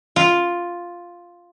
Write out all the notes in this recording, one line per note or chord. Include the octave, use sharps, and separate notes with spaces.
F4